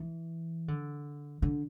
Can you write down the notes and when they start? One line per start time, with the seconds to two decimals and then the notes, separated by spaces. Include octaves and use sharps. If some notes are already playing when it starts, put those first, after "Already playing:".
Already playing: E3
0.68 D3
1.42 D3